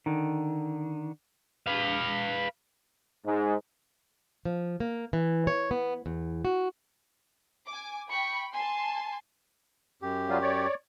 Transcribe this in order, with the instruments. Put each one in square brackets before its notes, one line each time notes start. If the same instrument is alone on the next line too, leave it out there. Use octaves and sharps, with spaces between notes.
[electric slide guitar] D3 D#3
[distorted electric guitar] B4 F5
[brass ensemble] G#2
[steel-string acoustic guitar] F3
A#3
E3
C#5
B3
E2
F#4
[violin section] G#5 D6
[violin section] G5 B5 [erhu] C#6
[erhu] G#5 [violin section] A5 C6
[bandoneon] F#2 G4
[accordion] F#3 G3 F4
C#5 D5